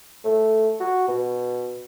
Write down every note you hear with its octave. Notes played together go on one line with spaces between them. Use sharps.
A3
F#4
B2